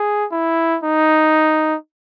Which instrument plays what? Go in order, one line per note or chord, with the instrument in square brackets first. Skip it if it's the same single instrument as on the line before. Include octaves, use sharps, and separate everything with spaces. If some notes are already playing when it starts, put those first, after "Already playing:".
Already playing: [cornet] G#4
E4
D#4